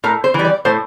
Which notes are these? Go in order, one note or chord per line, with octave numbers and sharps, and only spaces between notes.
A2 A#4
C5
E3 G3
D5
A2 C5